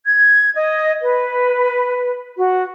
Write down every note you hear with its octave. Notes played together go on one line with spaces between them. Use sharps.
G#6
D#5
B4
F#4